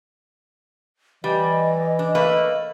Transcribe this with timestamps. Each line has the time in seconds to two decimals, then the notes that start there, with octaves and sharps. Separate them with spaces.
1.24 E3 G3 D#5
1.99 D4
2.15 A3 A#3 B4